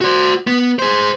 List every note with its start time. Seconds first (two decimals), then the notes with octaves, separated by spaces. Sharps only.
0.01 F#4 C5
0.47 B3
0.79 G#4 C5